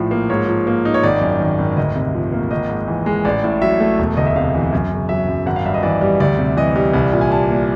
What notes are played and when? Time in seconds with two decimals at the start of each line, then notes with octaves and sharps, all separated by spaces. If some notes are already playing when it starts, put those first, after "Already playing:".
Already playing: A#1 A2 F3 C5
0.11 A#3
0.29 G#2 C#5
0.48 F3
0.67 A#3
0.85 D#4
0.94 C#5
1.03 G#1 D5
1.21 F#2
1.40 D#3
1.58 G#1
1.77 D2 D#5
1.95 C3
2.15 F3
2.32 A#3
2.51 G#1 D#5
2.69 G#2
2.88 E3
3.06 G#3
3.25 A1 D5
3.44 A2
3.62 F#3 E5
3.80 A3
3.99 E1
4.17 D2 D#5
4.27 E5
4.36 C3 F5
4.54 E3
4.72 F#2
4.91 C#3
5.09 F#3 E5
5.28 F#2
5.46 G#1 F#5
5.56 F5
5.65 G2 E5
5.74 D#5
5.83 E3 D5
6.01 G3
6.20 D2 D5
6.39 C3
6.57 E3 D#5
6.76 G3
6.94 C2
7.13 A#2
7.21 G#5
7.31 G3 A5
7.49 A#3